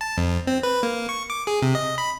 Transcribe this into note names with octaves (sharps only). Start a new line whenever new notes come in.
A5
F2
C4
B4
A#3
C#6
D6
G#4
C3
D#5
B5